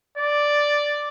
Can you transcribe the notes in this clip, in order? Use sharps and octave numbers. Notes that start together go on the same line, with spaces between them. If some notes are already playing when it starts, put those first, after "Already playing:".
D5